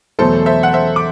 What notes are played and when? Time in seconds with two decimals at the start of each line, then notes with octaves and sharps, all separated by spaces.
0.19 E2 B2 F#3 A3 A4 C5
0.46 C5 E5
0.63 F#5
0.73 C5 E5
0.96 D6